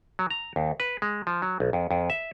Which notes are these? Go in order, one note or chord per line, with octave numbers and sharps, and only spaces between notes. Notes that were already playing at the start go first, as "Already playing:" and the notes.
F#3
A#5
D#2
B4
G#3
F3
F#3
B1
F2
F2
E5